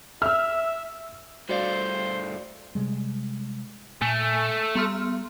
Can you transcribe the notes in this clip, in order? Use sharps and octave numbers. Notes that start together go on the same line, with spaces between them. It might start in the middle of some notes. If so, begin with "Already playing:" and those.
E5 E6 F6
G2 A3 F#4 C5 D5 F5
C3 G3 G#3
A#2 A3 G#5
G3 B3 C6 F6